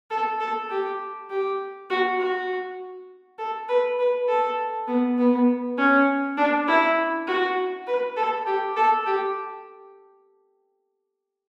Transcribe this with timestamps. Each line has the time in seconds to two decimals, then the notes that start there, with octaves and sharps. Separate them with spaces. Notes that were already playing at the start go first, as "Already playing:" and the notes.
0.11 A4
0.40 A4
0.70 G4
1.30 G4
1.90 F#4
2.19 F#4
3.38 A4
3.69 B4
3.99 B4
4.28 A4
4.88 B3
5.18 B3
5.78 C#4
6.37 D4
6.67 E4
7.27 F#4
7.87 B4
8.17 A4
8.46 G4
8.76 A4
9.06 G4